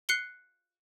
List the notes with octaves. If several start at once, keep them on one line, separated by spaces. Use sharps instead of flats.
F#6 C7 C#7 G7